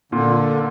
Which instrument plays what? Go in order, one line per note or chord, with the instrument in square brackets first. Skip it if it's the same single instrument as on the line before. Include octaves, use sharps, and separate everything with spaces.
[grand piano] A#2 [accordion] D3